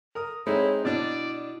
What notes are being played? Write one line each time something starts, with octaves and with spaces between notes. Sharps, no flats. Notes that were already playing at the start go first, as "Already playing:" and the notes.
A#4 D#6
G#3 C4 D#4 E4 C#5
B2 D4 E4 D5